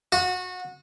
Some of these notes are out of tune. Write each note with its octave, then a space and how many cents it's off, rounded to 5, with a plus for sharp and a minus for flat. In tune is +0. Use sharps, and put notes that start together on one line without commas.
F#4 -25